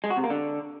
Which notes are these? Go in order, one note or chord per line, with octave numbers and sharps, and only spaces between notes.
G#3
F#4
C3
A#3
D3